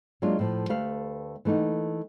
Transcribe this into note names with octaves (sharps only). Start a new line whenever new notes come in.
F#3 G#3 A#3 D4 F4
A2 F3
D2 A3 G4 B4 F5
E3 A3 A#3 D#4 F#5